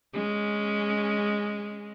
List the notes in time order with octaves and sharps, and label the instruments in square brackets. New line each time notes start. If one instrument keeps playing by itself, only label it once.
[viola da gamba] G#3 C#4